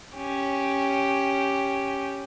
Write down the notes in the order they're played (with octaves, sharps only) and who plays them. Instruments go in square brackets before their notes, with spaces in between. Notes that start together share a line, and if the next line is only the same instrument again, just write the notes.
[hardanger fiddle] C#4 G4